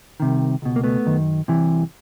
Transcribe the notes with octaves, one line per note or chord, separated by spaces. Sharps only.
C2 C3 D#3
C#2 B2
A#3
A3 B3
F#2 D#3
C2 C3 E3